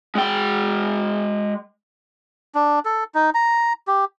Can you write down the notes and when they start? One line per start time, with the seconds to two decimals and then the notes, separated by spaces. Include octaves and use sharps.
0.15 G#3 G5
2.55 D4
2.85 A4
3.15 D#4
3.34 A#5
3.87 G4